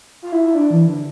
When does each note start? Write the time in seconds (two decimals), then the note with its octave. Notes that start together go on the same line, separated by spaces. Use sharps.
0.22 F4
0.32 E4
0.43 E4
0.55 D4
0.70 E3
0.88 D3